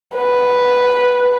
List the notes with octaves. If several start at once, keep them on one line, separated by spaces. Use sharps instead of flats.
B4